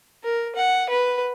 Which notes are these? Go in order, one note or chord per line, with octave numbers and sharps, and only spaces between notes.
A#4
F#5
B4